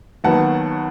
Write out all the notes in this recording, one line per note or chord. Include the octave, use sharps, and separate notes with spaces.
D#2 D#3 F#3 B3 F#5 A5